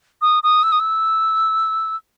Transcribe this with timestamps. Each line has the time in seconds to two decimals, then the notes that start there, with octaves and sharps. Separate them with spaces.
0.21 D#6
0.43 D#6
0.63 E6
0.72 D#6
0.80 E6